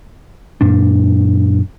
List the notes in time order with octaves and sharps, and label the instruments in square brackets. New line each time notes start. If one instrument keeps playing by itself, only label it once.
[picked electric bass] F#2 A#2 D4